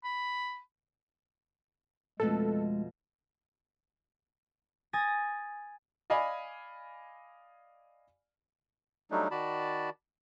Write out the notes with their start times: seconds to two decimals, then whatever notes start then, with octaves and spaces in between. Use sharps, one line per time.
0.04 B5
2.20 F2 B2 G#3 A3 A4
4.93 G#5 D#6 A6 A#6
6.10 D5 D#5 F5 G#5 B5
9.11 F#3 G3 A3 D4 D#4
9.31 D#3 F#4 D5 A5 B5